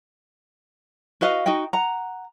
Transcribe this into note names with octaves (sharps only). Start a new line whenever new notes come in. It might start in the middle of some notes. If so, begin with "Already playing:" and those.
F#4 B4 D#5 F5
D#4 F#4 D#5 G5
F#5 A#5